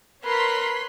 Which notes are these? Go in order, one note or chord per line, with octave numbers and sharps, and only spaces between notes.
A#4 B4 C#5 C6 B6